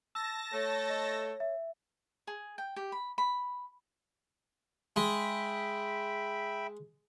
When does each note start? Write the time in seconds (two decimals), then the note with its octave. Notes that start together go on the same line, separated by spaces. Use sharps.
0.15 A5 E6 A#6
0.53 A3 A4 C#5
0.90 D#5
1.40 E5
2.27 G#4
2.58 G5
2.76 G4
2.92 B5
3.18 B5
4.96 G#3 E5 G5 B5